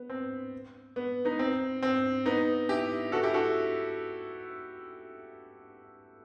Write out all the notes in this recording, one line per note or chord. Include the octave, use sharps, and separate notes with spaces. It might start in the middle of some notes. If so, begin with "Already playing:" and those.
Already playing: B3
C4
B3
B3 D#4
C4
C4
B3 D#4
E4 G4
F#4 A4
E4 G4
F#4 A4